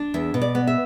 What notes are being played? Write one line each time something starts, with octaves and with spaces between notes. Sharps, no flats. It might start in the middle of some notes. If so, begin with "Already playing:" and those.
Already playing: D4
E2 E5
B2
D5
B3
E5